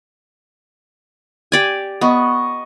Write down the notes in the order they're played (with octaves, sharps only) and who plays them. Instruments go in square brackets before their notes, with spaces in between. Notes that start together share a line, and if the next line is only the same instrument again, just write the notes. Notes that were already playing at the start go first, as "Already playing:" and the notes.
[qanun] G4 D5 G#5
[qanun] B3 [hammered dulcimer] D#5 C#6